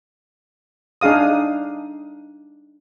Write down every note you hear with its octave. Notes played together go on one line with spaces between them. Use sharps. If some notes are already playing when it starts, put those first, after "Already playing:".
D4 D#4 G#4 F5 D#6